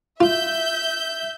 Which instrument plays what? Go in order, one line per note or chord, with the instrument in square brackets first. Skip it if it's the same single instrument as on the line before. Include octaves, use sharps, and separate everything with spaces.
[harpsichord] F4 [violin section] E5 G6